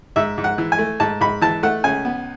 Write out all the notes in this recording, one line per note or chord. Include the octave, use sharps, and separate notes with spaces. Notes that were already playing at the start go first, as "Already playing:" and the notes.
G#2 E5
G#2
F#5
E3
G#5
A3
G#2 A5
G#2 B5
E3 A5
A3 F#5
C#2 G#5
B3